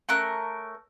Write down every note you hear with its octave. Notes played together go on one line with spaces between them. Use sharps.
A3 C#4 A#4 F#6